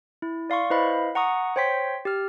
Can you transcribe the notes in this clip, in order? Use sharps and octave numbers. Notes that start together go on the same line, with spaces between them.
E4
D5 F5 C6 C#6
E4 B4 C5 D#5 F5 B5
F#5 A#5 C#6 D#6
C5 C#5 G5 C6 B6
G4 F6